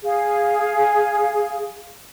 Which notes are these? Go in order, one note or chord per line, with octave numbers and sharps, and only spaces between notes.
G#4 F5